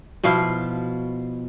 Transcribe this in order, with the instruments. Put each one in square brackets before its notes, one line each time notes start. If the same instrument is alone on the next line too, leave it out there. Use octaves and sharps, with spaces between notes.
[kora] B2 F3 E4 F5